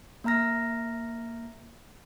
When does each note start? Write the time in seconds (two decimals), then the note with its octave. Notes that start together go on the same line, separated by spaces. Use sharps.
0.24 A#3 E5 A#5 F6 A#6